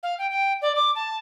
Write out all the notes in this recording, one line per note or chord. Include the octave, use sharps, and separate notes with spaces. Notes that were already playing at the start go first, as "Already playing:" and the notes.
F5
G5
G5
D5
D6
A5